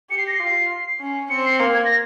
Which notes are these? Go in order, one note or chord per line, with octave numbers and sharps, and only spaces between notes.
G4 C#7
C7
A#6
C7
F4
C#4
C4 C#7
C7
A#3
G#6
A#6